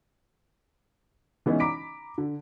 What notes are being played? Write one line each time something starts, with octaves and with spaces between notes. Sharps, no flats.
E3 G#3 B3 C#4 D#4 E4
A#5 B5 D6 B6 D7
D3